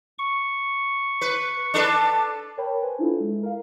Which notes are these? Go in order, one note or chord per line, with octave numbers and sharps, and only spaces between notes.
C#6
B4
D4 A4 B4
A#4 C#5 G5 A5 B5
B4 C5 G#5
D4 E4 F4 A4
G#3 E4
A#4 F5